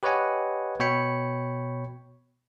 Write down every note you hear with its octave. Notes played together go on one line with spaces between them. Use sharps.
G4 B4 C#5 D#5 F#5 G#5
B2 C#5 G5 B5 C#7